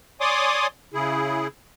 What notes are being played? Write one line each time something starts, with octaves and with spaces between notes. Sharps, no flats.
C#5 D5 G#5 C6 D6 D#6
C#3 E4 G#4